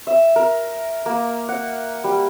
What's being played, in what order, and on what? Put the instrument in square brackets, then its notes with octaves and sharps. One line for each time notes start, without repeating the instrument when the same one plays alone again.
[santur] E5
A#4
A#3
F#5
G3